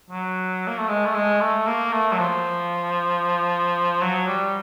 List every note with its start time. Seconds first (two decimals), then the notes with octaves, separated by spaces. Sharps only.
0.10 F#3
0.67 A#3
0.78 A3
0.88 G#3
1.06 A3
1.14 G#3
1.41 A3
1.67 A#3
1.93 A3
2.12 F#3
2.19 F3
4.02 F#3
4.27 G3